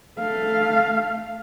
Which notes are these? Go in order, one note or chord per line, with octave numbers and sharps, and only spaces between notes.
A3 F5